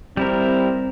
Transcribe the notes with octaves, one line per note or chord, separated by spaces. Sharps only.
G3 C4 E4 A#4